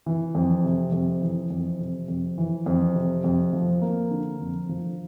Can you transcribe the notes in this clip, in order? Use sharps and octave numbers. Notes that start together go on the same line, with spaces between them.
E3
F2
C3
F2
E3
F2
C3
F2
E3
F2
C3
F2
F3
A#3
D3
F2
F3